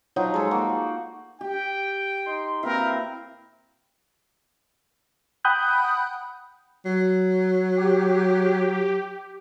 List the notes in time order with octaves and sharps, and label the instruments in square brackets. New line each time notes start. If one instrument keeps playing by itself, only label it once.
[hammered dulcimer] F3 F#3 D#4
G#3 A4
A#3 F#4
F#5
[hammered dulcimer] G4 [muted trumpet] G5
[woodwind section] D#4 C6
[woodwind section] B2 A#3 C4 [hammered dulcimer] E4 [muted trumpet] A#4
[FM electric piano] F#5 G5 B5 D#6 F#6 G6
[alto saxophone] F#3
[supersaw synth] G4